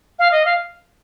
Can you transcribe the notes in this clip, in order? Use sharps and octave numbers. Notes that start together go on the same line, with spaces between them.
F5
D#5
F5